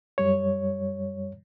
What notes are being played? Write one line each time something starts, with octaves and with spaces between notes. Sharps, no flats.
F#2 G3 C#5